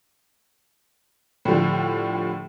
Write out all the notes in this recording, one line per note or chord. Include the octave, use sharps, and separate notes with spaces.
A2 D3 F3 G3